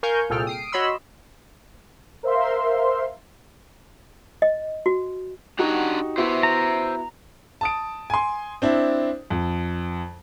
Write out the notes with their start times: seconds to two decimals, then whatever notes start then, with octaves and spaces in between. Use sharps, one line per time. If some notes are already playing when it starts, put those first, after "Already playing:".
0.03 A#4 F5 G#5 C#6 F6 G6
0.30 C2 A#2 G#4 A4 G5 F6
0.47 D#6 C7 D7
0.72 F#4 C#5 D#5 B5 C6 E6
2.23 A#4 C5 E5 F5 C6
4.42 D#5
4.86 F#4
5.59 D4 D#4 F#4 G4 F#5 A#5
6.18 B3 E4 F#4 C5 E5
6.43 A#5
7.61 A5 D#6 D7
8.10 G#5 C6
8.62 C4 D4 E4
9.30 F2